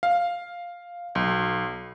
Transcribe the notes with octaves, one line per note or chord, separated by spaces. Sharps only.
F5
B1